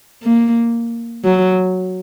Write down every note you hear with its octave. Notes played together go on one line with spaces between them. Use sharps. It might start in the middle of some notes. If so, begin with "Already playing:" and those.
A#3
F#3